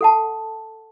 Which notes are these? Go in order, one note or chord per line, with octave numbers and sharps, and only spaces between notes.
A4 F#5 A5